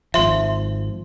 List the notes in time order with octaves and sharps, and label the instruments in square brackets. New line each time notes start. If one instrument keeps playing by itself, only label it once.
[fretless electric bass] G#1 F3 [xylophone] E5 C6